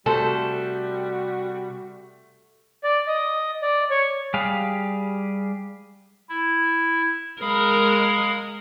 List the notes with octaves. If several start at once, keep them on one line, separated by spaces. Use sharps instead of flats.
C3 G3 A3 F#4 A4 C5
D5
D#5
D5
C#5
G3 G4 G#4 F5
E4
G#3 A#4 F5 B5 D#6